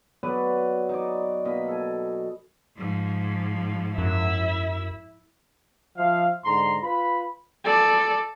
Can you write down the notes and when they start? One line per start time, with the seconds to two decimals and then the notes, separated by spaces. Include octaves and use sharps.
0.23 F#3 B3 B4 D5
0.89 D#4 D5
1.45 B2 A#3 D#5 B5
1.68 A4 G#5
2.77 G#2 F3
3.98 F#2 E4 E5
5.97 F3 E5 F5
6.45 G#2 D3 A#5 C6
6.83 F4 B4 B5
7.64 A4 D5